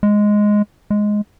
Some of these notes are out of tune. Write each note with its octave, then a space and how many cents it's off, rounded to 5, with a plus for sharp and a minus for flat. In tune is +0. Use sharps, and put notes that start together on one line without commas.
G#3 +0
G#3 +5